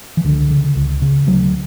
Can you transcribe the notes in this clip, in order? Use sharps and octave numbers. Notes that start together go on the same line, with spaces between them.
E3
C#2 D3
C#3
C#2
C#3
D2 F#3